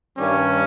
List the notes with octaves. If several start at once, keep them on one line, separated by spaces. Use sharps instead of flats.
G2 D#3 G3 C#4